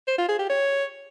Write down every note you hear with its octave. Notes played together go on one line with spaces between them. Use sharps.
C5
F4
G#4
G4
C#5